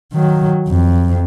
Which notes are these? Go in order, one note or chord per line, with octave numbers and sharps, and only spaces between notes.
D#3 F#3
F2